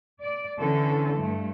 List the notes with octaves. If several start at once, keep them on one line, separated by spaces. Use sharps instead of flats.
D5
D3 E3 C#4 A4
G2 A3